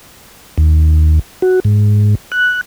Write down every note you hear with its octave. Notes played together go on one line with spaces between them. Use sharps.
D#2
F#4
G#2
F#6